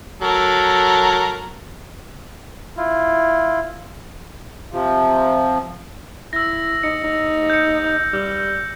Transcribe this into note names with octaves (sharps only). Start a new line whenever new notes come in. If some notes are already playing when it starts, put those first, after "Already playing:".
F#3 A4 A#4
E4 F4
C3 F3
E4 E6 A#6
D#4 C#7
D#4
G6 C#7
G3